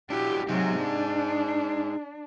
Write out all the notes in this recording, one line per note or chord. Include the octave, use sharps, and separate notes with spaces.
D4 E4 F#4 G4
C3 F#3 D#4 G#4
D4